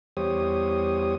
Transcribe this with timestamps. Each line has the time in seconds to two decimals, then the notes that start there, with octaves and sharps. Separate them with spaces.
0.17 E2 G3 G4 C5 C#5 D#6